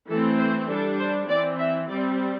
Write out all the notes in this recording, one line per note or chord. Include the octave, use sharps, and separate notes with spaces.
E3 A3 C4 A4
C5
G3 D4 A4
C5
E3 C4 D5
E5
G3 C4 D5